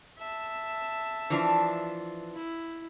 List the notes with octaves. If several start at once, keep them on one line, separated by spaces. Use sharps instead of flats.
E5 A5
E3 F3 D4
E4